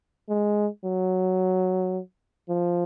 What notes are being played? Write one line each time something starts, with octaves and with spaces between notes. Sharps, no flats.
G#3
F#3
F3